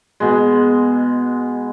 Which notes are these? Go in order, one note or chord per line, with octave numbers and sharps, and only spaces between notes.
B2 G#3